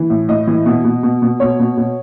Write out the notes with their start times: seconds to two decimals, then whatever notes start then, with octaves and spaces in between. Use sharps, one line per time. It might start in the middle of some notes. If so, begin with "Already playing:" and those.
Already playing: E3
0.10 A2
0.28 A2 D#5
0.47 E3
0.66 B2
0.84 B2
1.03 B2
1.22 B2
1.40 B2 C#5
1.60 B2
1.77 B2